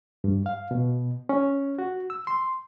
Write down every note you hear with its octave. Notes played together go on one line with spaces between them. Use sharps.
G2
F5
B2
C#4
F#4
E6
C6